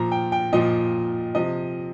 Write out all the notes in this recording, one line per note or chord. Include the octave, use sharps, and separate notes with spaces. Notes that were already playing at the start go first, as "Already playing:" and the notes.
Already playing: A#2 F3 A#5
G5
G5
A#2 F3 D#5
C3 F3 D#5